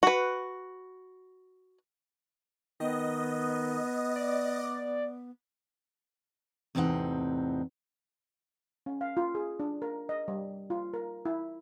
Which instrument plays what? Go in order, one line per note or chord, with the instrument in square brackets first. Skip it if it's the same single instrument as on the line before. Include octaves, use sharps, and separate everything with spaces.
[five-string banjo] F#4 B4
[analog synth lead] D#3 [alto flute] B3 [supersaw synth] D#5
[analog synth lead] D5
[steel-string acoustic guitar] E2 A2 C3 C4 D#4 F#5
[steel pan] C#4
F5
F4
G#4
D4
A#4
D#5
G3
F4
A#4
E4